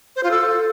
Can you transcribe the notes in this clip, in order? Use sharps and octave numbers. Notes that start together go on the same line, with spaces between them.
C5
F4
A4